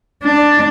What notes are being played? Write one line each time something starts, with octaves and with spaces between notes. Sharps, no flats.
D4